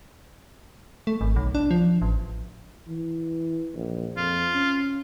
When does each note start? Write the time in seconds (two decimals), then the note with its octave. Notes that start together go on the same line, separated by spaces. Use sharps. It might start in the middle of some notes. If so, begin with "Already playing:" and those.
1.07 A3
1.21 G#1
1.36 B1
1.55 D4
1.71 F3
2.02 A1
2.88 E3
3.74 A#1
4.16 F2 F4
4.54 C#4